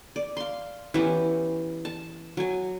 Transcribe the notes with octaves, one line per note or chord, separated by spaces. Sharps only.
D5
F5 C6
E3 B3 C#4 G4
A5
F#3 G#5